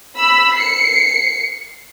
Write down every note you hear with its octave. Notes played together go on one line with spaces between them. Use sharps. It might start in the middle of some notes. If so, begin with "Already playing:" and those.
B5 E6
C7 C#7